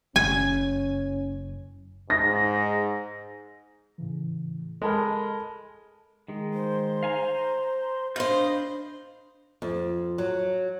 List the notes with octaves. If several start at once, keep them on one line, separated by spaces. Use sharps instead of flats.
F#1 C#4 G#5
G#2 A#6
A2 C#3 E3
G#3 A4 A#4 A5 B5
D#3 G#3
C5
F5 G#5 A#5
A#5
D4 F4 C5 D#5 B5 G6
F2
F#3